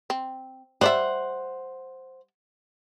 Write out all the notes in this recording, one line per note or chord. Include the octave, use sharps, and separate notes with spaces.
C4
G3 C5 D5 E5 F#5